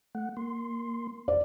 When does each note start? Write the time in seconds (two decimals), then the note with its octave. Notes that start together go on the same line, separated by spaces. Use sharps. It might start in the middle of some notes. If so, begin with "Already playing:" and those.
0.15 A3 F#5
0.37 A#3 C6
1.28 E2 D5